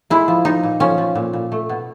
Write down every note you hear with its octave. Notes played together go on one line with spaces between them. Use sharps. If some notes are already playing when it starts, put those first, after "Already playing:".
G#3 E4
F3
F3 D#4
A#2
F3 C#4
F3
A#2
A#2
A3
B2